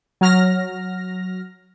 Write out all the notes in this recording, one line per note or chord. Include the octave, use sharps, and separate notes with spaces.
F#3 F6 A#6